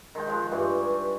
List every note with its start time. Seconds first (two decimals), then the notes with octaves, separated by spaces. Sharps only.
0.15 D#3 G#3 G5
0.28 F3 G#3
0.52 G2 E3 G4 C#6